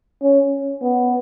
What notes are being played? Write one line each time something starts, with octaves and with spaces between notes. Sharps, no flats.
C#4
B3